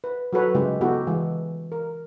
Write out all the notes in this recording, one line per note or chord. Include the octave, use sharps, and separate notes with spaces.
B4
F#3 F#4 A4 B4 C#5
C#3 G#3 A3 G4
B3 D#4 E4 F#4 G4 A4
E3 G#3
A#4